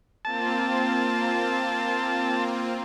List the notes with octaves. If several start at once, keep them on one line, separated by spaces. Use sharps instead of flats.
A#3 C4 F4 A5